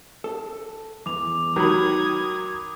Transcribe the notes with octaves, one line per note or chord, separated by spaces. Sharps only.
A4
E2 D6 F7
D#3 F#3 A#5 B5 D#6 G#6